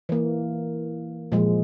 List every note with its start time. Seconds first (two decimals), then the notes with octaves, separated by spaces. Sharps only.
0.09 E3 A#3
1.32 A#2 F3 G#3